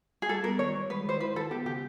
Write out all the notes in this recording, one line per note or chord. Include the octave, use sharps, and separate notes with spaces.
G#4
G3 A4
B3 A#4
D#3 C#5
G3
G#3 B4
D#3 C5
E4 B4
D#3 A4
B3 G4
C#3 G4